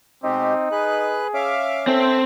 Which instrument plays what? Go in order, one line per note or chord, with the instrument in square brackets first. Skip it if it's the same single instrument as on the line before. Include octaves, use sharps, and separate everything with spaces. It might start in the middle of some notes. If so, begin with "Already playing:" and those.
[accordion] B2 G#3 G4 [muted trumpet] C4 [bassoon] D#4
[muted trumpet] G#4 [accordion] B4 F#6
[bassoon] C#4 [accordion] E5 F5 D6
[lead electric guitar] C4 [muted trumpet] A4 [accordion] E5 G5